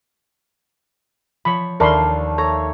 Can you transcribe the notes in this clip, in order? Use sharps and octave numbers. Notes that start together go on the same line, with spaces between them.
F3 C#5 B5
D#2 A3 D4 A#4 F5 B5 C6
A4 C#5 A#5